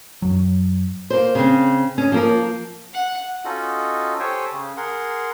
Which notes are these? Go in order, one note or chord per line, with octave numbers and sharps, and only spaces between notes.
F#2 F#3
A#3 C5
C#3 C4
C#4 D#5
F3 A#3 A#4
F#5
C#4 D#4 F4 F#4 A4 D#5
G4 A4 C5 C#5 G5 G#5
C#3
G#4 A#4 F#5 C6